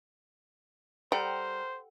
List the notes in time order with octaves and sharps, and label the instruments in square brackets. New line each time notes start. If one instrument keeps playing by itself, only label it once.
[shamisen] G3 [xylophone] A4 F#5 G5 [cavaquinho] A#4 [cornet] C5